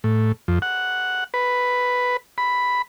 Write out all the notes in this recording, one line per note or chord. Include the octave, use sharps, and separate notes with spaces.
A2
F2
F#5
B4
B5